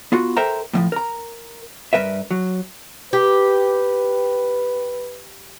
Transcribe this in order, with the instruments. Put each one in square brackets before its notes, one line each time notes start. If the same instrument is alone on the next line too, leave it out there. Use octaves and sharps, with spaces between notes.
[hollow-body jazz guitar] B3 F4 F#4
A4 A#4 C5 E5 G5 A#5
A2 E3 F3
A#4 A#5
G2 A#4 B4 E5
F#3
[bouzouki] G4 [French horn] B4